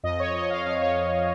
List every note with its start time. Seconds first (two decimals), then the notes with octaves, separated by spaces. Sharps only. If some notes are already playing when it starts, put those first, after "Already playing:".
0.03 F2 D#5
0.19 C#5
0.35 F2 D#5
0.50 F5
0.66 F2 F5
0.81 C#5